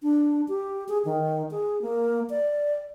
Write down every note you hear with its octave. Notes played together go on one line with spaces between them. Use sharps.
D4
G4
G#4
D#3
G#4
A#3
D5